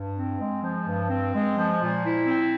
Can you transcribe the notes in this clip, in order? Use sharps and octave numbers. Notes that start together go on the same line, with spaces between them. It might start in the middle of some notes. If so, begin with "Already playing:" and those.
Already playing: G2
C4
G#3
F3
G2
C4
G#3
F3
A#2
E4
C4